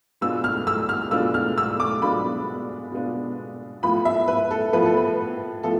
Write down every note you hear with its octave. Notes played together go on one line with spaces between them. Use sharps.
B2 G#3 B3 D4 F4 E6
F6
E6
F6
B2 G#3 B3 D4 F4 E6
F6
E6
D6
B2 G#3 B3 D4 F4 B5
B2 G#3 B3 D4 F4
A2 F3 B3 F4 B5
E5
B4
A4
A2 F3 B3 F4 B4
A4
B4
A2 F3 B3 F4 A4